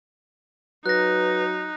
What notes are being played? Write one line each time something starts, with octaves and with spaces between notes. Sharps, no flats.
F#3 D#4 B4 F#6 A#6